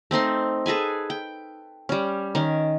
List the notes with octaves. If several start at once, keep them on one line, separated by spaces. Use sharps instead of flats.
A3 C4 D#4 C6
G#4 A4 B4 G#5
G5
G3 C#4
D#3 C#4